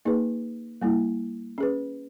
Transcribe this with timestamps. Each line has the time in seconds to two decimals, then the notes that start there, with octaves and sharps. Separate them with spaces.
0.05 A#3 D#4 G#4 B4
0.82 G3 A#3 E4
1.58 C#4 G#4 B4